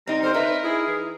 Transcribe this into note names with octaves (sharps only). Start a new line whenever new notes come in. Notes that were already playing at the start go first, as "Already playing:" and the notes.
G3 C4 D#4 A#5
D3 A#4 C5
D#4 B4 E5
E4 G#4
E3